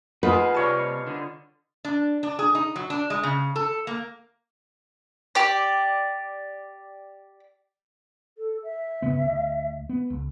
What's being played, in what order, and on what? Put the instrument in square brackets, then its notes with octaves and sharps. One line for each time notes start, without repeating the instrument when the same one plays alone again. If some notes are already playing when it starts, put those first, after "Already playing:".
[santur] D#4 F4 G#4 [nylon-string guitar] B4 [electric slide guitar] D#5 F#5
[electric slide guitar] C3 A5 [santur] G3 C#5 F5
[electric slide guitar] D3
[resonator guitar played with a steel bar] D4
D4
G#4
D#4
F#3
D4
G#3
C#3
A4
A#3
[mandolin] G4 D5
[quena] A4
E5
[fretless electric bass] G1 C#3 B3
D2
B3
C#2